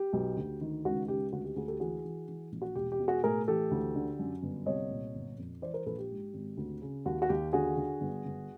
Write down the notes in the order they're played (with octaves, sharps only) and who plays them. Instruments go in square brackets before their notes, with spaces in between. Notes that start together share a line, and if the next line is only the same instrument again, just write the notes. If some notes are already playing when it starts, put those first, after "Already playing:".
Already playing: [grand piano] G4
B1
D2
D#3
C#2 F#4
C#2 G4
D2 F#4
G4
D2 F#4 G#4
G4 A4
E3 F#4 G#4
E3
E3
A#1
F#4
E1 G4
G4
B2
F#4 G#4
A2 G#4 A#4
E3 G4 A4
D2
D3
F#2
G1
C2 C#5 D#5
A#2
G1
F2
E3 C5 D5
A#4 C5
A#1 A4 B4
G4
G#2
G#1
D2
C#3
D#2 F#4
F#4
D#2 G4
D3 F#4 G#4
D3
G1
G1